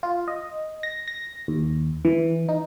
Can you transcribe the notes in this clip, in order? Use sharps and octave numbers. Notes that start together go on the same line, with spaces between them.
F4
D#5
A#6
A#6
D#2
E3
D#4